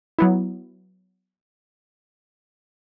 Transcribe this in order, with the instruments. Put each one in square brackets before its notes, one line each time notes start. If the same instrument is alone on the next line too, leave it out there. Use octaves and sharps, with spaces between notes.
[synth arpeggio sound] F#3 B3 E4